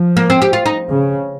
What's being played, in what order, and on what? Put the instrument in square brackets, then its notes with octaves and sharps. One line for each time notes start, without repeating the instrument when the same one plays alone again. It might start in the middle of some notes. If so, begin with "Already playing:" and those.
Already playing: [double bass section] F3
[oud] A#3
C4
G4
F4
D#4
[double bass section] C#3